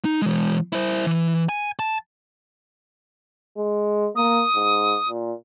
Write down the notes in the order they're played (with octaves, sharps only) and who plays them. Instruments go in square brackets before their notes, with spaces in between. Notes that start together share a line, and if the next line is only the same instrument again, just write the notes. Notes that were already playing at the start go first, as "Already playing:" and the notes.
[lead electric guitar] D#4
E3 G#3
E4 C5
E3
G#5
A5
[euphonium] G#3
[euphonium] A#3 [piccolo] D#6
[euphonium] G#2
A#2